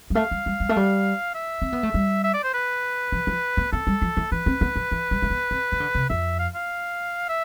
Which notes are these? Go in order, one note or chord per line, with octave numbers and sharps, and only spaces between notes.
G3
A3 F5
G3
G3
G3
A3
G3
E5
C4
B3
A3
G3
E5
D5
C5
B4
F3
F3
B3
B3 A4
G3
F3
E3
E3 B4
C4
B3
F3
E3
G3
A3
B3
C4
E3
D3
C3
F2 E5
F5
F5
E5